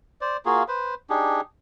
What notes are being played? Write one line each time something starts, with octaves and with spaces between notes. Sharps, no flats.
C5 D5
A#3 F4 F#4 G#4
B4 C5
D4 D#4 G4 G#4